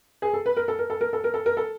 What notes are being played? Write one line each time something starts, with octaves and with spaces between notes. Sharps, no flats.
G#4
A4
B4
A#4
A4
A#4
A4
A#4
A4
A#4
A4
A#4
A4